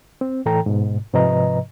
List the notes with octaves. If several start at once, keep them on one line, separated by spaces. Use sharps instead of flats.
C4
A2 E3 A4 G5 A#5
G#2 B2
G#2 C3 F3 B4 D#5 A#5